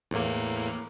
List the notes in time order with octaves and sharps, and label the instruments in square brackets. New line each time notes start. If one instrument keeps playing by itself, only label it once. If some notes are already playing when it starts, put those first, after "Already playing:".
[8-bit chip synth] E2 A2 A#3